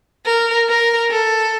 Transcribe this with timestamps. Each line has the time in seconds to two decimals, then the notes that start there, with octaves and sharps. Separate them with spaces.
0.26 A#4
0.68 A#4
1.10 A4